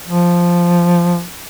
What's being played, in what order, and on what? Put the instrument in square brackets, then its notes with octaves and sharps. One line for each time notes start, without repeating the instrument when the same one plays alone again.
[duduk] F3